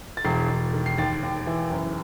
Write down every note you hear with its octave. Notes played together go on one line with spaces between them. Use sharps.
A6
E1 C7
E1
D#3
C7
D#2 A6
D#2
E3
F#1